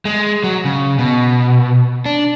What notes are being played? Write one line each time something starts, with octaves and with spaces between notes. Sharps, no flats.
G#3
F#3
C#3
B2
D4